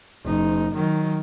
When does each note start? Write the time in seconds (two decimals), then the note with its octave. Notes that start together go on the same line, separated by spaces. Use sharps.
0.24 F#1 D#4
0.74 D#3 F#3